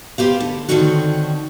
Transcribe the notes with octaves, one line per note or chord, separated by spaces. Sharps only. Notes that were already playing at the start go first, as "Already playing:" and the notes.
B3 G4 C5 F5
D3
D3 D#3 A3 C4 C#4 F#4